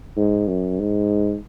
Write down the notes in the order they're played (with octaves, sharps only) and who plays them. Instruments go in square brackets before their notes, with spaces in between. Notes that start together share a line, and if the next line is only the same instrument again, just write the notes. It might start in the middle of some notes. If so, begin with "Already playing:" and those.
[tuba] G#2
F#2
G#2